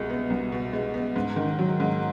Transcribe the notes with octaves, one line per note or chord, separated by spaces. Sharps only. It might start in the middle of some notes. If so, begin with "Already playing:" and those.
Already playing: C2 B2 G#3
B3
C2
B2
G#3
B3
G#2
D#3
F#3
G#2